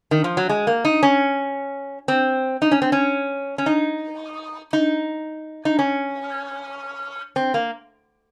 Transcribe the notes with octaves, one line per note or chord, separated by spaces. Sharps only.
D#3
F3
F#3
G#3
A#3
D#4
C#4
C4
D#4
C#4
C4
C#4
C#4
D#4
D#4
D#4
C#4
C4
A#3